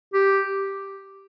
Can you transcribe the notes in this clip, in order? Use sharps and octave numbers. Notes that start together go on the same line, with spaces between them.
G4